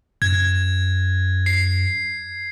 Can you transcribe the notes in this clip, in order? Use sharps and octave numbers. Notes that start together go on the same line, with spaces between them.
F#2 G#6
C7